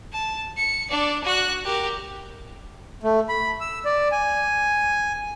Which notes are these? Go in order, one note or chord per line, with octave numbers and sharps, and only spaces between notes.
A5
C#7
D4 D5
F#4 F#6
G4 A#4
A3
B5
E6
D5
G#5